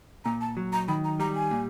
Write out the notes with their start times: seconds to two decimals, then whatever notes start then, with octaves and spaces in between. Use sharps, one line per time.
0.25 A#2 A#5
0.41 A5
0.57 F#3
0.73 A#5
0.88 D#3 B5
1.04 A#5
1.20 G3 A#5
1.35 G#5
1.51 A#2